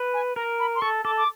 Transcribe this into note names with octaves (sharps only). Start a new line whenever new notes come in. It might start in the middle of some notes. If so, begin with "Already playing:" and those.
Already playing: B4
G#5
A#4 A#5
B5
C6
A4 C#6
A4 D6
D6